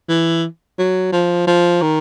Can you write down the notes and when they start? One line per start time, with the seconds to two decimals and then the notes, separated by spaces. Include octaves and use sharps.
0.08 E3
0.78 F#3
1.12 F3
1.47 F3
1.82 D#3